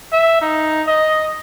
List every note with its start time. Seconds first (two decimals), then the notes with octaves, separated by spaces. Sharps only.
0.12 E5
0.41 D#4
0.87 D#5